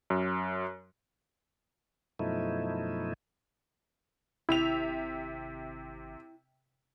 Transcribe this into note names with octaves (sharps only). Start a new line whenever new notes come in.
F#2
F#2 B2 F3 A3 D#4 E4
G#1 C3 E4 E5 F7